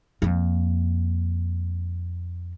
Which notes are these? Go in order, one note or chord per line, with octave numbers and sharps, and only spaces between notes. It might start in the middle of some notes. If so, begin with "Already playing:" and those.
F2 A#3